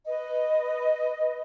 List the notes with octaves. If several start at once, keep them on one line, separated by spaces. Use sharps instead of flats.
B4 D#5